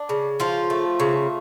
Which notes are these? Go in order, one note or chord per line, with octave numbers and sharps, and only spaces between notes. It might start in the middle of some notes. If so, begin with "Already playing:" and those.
Already playing: D4
C#3
F3 F4
A3
C#3